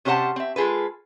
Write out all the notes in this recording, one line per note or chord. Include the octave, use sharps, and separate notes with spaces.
C3 C#4 G4 C5 F#5 A5
C4 E5
G#3 F4 G#4 A4 B4